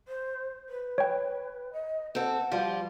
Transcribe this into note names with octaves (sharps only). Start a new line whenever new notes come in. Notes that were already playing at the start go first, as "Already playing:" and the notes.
C5
B4
C#5 G5
D#5
C4 A4 F#5
F3 G3 F4